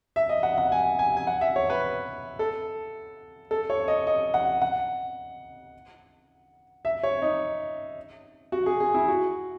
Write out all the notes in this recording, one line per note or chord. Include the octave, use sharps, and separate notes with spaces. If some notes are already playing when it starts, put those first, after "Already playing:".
E5
D#5
F#5
F#5
G#5
G#5
G#5
F#5
E5
C#5
B4
A4
A4
C#5
D#5
D#5
F#5
F#5
E5
C#5
D#4
F#4
G#4
G#4
E4
F#4